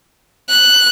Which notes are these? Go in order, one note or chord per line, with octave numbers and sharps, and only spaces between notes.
F#6